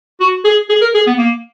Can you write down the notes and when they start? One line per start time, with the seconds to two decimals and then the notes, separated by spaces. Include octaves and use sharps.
0.20 F#4
0.45 G#4
0.69 G#4
0.81 A#4
0.95 G#4
1.07 B3
1.18 A#3